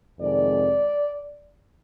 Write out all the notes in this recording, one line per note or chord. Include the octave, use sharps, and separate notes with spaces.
F2 C3 D#3 G#3 D5